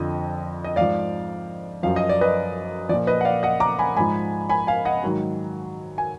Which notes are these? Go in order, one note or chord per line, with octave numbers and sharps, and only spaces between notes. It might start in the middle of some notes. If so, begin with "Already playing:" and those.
Already playing: F2 D3 F3 D#5
D#5
G#2 F3 D5 F5
F#2 F3 F5
D#5
D5
B4 D#5
A#2 F3 D5
B4 D#5
F#5
D5 F5
D#5 F#5
A#5 D6
G#5 B5
G#2 F3 G#5 B5
G#5 B5
F5 G#5
D#5 F#5
G#2 D#3 F#3
G#5